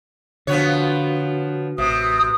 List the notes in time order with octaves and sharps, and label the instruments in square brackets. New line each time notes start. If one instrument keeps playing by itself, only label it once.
[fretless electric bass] D3 [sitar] F3 B3 C#5 [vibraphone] F#4 B4
[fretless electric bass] A1 [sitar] C3 [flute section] D#6